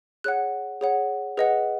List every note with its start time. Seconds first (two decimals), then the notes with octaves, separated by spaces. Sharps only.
0.24 G#4 C#5 F#5 F#6
0.81 G#4 C#5 F#5
1.37 G#4 B4 D#5 F#5